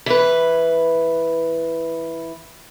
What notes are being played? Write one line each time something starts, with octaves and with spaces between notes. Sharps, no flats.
E3 B4